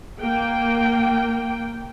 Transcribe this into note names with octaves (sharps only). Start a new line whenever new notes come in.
A#3 G5